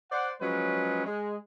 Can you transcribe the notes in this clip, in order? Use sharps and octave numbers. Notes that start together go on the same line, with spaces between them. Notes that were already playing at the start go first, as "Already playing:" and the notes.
C5 D5 F#5
F3 F#3 G#3 C#4 G#4 B4
G#3